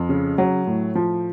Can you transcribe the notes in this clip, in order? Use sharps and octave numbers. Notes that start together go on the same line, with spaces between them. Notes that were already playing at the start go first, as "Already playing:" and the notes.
Already playing: F2
C#3
F#3
A2
F3